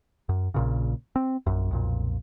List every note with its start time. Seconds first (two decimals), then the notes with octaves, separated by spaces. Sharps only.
0.29 F#2
0.54 A#1 A#2 C#3
1.16 C4
1.47 A#1 F#2
1.71 B1 F2 A#2